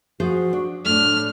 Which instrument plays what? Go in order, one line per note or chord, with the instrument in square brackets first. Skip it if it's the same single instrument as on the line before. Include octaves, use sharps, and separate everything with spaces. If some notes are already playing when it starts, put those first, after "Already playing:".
[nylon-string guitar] F3 G#4 C5 [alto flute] F#4
[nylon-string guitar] D4
[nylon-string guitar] A2 A3 [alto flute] D4 [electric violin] F6